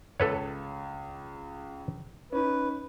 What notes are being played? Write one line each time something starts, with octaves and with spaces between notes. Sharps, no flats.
C#2 A4 B4 C#5
C#4 D#4 B4